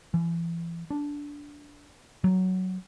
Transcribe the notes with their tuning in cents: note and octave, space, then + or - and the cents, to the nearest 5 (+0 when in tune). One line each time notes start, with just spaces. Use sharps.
E3 +35
D4 -15
F#3 +5